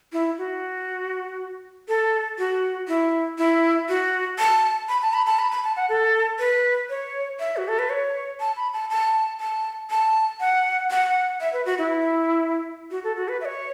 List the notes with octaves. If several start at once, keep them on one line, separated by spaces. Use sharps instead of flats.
E4
F#4
A4
F#4
E4
E4
F#4
A5
B5
A5
B5
A5
B5
B5
A5
F#5
A4
B4
C#5
E5
F#4
A4
B4
C#5
A5
B5
A5
A5
A5
A5
F#5
F#5
E5
B4
F#4
E4
F#4
A4
F#4
B4
E5
C#5